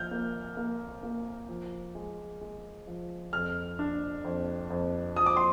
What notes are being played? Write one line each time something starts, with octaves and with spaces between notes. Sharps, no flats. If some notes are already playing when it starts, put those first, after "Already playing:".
Already playing: F3 F6 G6
A#3
A#3
A#3
F3
G#3
G#3
F3
F2 F6
D4
F2
F2
F3 D#6
D6
C6